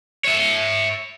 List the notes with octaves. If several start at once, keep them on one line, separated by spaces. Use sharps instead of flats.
C#5 E5